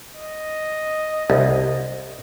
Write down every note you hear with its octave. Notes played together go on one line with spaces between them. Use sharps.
D#5
C2